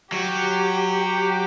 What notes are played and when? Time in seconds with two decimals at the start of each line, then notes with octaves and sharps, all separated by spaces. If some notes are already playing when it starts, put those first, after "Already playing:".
0.12 F#3 G4
0.93 G4